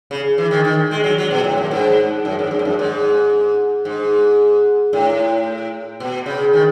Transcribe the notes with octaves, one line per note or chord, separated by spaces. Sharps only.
C#3
E3
D#3
D#3
G#3
F#3
F#3
B2
A2
F#2
G#2
F#2
G#2
F#2
G#2
F#2
G#2
G#2
A2
B2
C#3
D#3